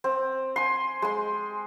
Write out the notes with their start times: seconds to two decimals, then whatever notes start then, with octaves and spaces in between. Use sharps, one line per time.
0.04 C4
0.56 G#5 C6
1.02 G#3 C6